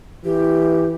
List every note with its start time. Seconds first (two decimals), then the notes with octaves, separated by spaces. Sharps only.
0.25 E3 G4